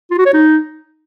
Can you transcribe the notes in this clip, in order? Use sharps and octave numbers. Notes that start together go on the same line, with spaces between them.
F4
F#4
C#5
D#4